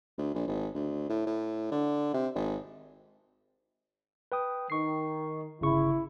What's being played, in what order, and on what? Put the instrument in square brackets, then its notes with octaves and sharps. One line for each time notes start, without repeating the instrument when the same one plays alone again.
[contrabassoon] D2
A#1
G#1
D2
A2
A2
D3
C3
G#1
[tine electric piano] B4 G5 D#6
[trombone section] D#3 [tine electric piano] C#6 C7
[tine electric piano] G1 C#3 C#6 [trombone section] E4